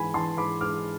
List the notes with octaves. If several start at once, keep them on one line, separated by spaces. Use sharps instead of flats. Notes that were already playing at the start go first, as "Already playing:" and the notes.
Already playing: G#2 E3 G#5 B5
E3 A5 C6
G#2 B5 D6
G#2 D6 F6